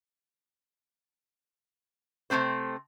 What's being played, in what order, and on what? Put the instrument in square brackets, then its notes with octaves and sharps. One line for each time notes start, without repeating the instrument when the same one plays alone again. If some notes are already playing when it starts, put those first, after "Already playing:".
[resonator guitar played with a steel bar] C3 F3 A3 C4 C5